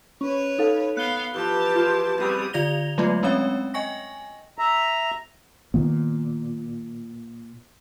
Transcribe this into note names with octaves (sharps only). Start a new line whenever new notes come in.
C#4 B4 C#5
D#4 A4 F5
B3 F5 F#6 G7
E3 F3 G4 A5
F4 G#4 C5
C#3 G3 B3 C4 D#6
D3 F4 D5 A#6 F7 G7
F#3 G#3 A3 B3 F4
G#3 C4 C#4 C#5 E5 G5
D#5 G5 G#5 C#6 A#6
E5 A#5
A#2 D#3 B3